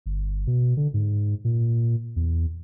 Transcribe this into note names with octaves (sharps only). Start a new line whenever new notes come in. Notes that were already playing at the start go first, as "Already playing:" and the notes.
G1
B2
D3
G#2
A#2
E2